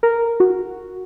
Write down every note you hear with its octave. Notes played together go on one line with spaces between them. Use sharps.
A#4
F#4